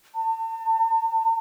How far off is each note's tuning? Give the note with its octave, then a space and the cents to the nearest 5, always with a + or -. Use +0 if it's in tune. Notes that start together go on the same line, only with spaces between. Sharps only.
A5 +40